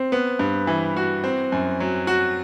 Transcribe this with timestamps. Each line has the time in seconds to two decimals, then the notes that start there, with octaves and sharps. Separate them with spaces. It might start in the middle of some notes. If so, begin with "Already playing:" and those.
Already playing: C4
0.12 B3
0.39 G2
0.67 E3
0.96 F#4
1.24 C4
1.52 F#2
1.80 F#3
2.07 F#4